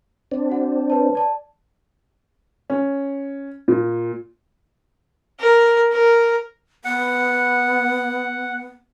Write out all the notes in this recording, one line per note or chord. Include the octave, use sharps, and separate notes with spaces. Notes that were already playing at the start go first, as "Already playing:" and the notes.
C4 D4
F#4 F#5
B4 C#5 A5
D5 A5
C#4
A#2
A#4
A#4
B3 F#5